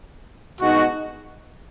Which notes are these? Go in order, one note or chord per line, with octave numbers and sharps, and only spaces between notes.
B2 G#3 D#4 F#4